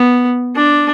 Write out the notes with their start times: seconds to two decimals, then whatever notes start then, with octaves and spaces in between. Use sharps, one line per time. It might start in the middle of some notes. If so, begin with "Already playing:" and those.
Already playing: B3
0.55 D4